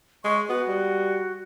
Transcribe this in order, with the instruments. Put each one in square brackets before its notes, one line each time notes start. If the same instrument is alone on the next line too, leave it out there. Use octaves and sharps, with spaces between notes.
[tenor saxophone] G#3 [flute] C#6
[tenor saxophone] B3 [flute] F#4
[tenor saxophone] G3